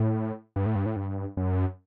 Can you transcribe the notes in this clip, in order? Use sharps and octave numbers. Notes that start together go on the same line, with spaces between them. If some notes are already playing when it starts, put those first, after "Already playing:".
Already playing: A2
G2
A2
G2
A2
G2
F#2